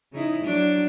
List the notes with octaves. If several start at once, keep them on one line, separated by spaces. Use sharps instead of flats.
C#3 D#4 E4
F#3 D4